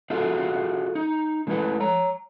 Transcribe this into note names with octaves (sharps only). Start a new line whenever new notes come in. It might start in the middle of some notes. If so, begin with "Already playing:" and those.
F4 F#4 G#4 A4 E5 F5
D#4
D3 G#3 A3 E4 A4 B4
C#5 A#5